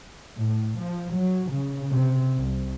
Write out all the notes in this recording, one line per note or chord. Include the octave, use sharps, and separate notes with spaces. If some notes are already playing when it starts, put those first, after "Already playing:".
A2
F3
F#3
C#3
C3
C2